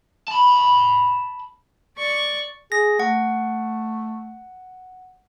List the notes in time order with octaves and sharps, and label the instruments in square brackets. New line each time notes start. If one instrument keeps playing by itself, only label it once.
[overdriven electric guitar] A5 B5
[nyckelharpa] D5 C#6
[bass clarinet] G#4 [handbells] A#6
[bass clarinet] A3 [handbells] F#5